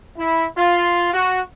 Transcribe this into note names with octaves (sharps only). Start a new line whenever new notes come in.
E4
F4
F#4